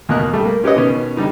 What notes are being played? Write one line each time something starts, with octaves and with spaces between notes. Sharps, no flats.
D#2 B2 A#3 A#4 D#6 F#6
G3 A3
A#3
C#4 G4 B4 C#5 D#5
B2 D#3 B3 C#4
D3 G3 D#4